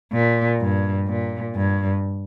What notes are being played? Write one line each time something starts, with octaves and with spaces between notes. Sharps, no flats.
A#2
G2
A#2
G2